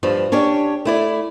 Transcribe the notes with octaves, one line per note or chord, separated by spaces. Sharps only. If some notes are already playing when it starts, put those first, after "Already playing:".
G2 F3
C#4 D4 G4 C#5
A3 E4 D5